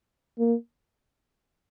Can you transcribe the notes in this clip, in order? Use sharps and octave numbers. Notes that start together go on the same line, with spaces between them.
A#3